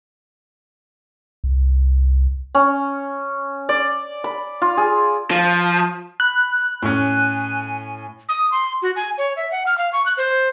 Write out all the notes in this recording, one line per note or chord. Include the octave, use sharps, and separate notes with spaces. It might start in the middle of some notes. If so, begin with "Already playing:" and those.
C2
C#4
D5
B5
F4
G#4
F3
B5 F#6
A2 C#4 G#5
D#6
C6
F#4
G#5
C#5
E5
F#5
F6
F5
C#6
F#6
C5